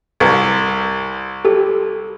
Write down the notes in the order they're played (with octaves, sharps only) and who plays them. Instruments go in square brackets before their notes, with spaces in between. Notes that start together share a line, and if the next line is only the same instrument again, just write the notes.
[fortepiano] C2
[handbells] G4 A4